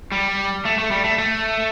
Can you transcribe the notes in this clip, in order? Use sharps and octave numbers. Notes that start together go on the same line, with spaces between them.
G3
A3
A3
G3
A3
A3